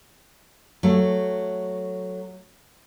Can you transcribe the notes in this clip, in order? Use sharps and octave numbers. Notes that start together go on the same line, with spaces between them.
F#3 A3